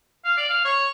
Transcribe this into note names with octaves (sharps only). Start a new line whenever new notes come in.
F5
D5
F5
C#5